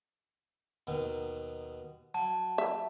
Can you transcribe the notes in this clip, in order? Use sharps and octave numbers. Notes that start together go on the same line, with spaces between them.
D#2 B2 D#3
F#3 A5
E5